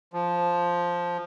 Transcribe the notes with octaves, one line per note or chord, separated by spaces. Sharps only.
F3